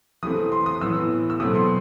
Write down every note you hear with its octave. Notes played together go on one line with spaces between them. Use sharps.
E3 A3 C4 D#6
C6
D#6
A2 E3 B3 E6
E6
B2 F#3 A3 C4 D#6
C6